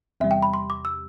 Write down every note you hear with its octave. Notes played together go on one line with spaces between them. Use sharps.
E2 C3 G3 E5
G5
B5
C6
D6
E6